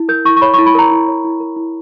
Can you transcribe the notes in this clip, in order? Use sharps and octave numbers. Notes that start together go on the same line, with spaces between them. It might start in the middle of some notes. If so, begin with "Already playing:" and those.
Already playing: E4
A#4 G6
E4 C#6
C#6
C#5 B5
C#6
E4
B5
A#4 A#5
E4
C#5
E4
A#4
E4